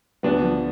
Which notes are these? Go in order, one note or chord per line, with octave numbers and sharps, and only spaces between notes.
D2 B3 D4
F3